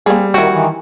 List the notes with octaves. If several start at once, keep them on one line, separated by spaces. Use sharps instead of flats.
G3 A#3 C4 G#4
D#3 C4 E4 F#4
D#3 E3